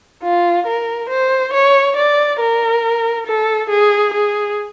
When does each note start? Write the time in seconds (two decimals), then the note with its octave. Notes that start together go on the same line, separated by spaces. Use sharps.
0.23 F4
0.67 A#4
1.10 C5
1.53 C#5
1.97 D5
2.40 A#4
3.27 A4
3.70 G#4
4.14 G#4